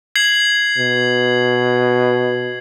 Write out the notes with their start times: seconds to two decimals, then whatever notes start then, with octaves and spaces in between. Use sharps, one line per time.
0.15 G#6 C7 F#7
0.78 B2